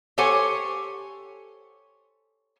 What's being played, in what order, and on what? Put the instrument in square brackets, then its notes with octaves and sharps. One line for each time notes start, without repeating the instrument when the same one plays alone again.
[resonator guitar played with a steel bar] G4 A4 C5 C#5 F#5 G#5